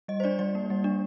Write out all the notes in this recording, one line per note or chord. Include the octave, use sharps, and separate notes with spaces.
G3 D#5
C5
D4 D5
G3 D5
A#3
G3
D4